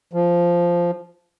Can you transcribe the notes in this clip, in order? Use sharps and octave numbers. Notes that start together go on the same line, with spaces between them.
F3